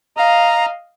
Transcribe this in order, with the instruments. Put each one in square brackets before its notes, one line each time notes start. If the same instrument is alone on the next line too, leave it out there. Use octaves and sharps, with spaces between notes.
[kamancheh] D#5 F5 [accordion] A#5